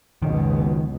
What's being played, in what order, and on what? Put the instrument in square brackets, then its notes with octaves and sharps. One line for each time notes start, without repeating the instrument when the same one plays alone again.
[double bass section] F#1 C#2 B2 [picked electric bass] D#3